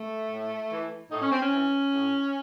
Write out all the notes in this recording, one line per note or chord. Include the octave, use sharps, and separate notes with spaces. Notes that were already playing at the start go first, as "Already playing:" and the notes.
Already playing: A3
A2
E3
A2 D#4
C#4
C4
C#4
E3
A2